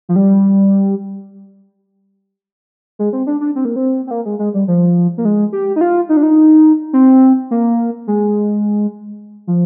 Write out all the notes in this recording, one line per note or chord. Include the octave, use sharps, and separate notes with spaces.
F3
G3
G#3
C4
D4
D4
C4
A#3
C4
C4
A#3
G#3
G#3
G3
F3
A#3
G#3
G4
D#4
F4
D#4
D4
D#4
C4
A#3
G#3
F3